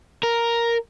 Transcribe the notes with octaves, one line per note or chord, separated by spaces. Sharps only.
A#4